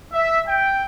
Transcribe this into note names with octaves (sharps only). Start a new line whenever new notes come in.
E5
G5